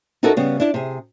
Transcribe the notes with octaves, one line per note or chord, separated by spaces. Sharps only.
D#4 E4 F#4 A4 A#4 C#5
C#3 G3 B3
D4 E4 D5
C3 G#4